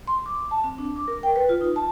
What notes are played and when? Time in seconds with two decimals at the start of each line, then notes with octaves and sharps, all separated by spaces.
0.07 C6
0.26 D6
0.51 A5
0.64 C4
0.78 D4
0.96 D6
1.08 A#4
1.23 G5
1.36 B4
1.49 F4
1.61 D#4
1.76 A5